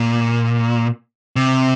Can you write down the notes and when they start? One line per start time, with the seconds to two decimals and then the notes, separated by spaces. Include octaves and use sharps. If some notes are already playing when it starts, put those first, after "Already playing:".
Already playing: A#2
1.36 C3